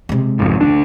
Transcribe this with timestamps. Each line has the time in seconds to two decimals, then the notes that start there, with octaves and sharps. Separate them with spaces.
0.09 C3 G#3
0.39 G#1 F2
0.61 D2 G3 D4